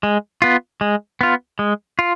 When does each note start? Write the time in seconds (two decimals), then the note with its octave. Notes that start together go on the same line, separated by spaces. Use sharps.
0.03 G#3
0.42 B3 F4
0.81 G#3
1.21 B3 F4
1.59 G#3
1.99 F4